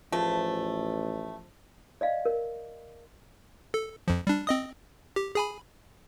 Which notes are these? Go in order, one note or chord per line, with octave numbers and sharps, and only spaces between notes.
A1 F3 A3 G#4 B4
D5 D#5 F5
A#4
A4
F2 F3
G3 D4
C4 D#5 D#6
G4
G#4 G#5 B5